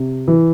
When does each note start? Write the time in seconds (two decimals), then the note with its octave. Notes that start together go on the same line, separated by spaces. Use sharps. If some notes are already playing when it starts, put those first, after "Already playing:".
Already playing: C3
0.28 E3